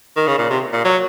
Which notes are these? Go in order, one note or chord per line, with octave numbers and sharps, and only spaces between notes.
D#3
C#3
A#2
C3
A#2
F#3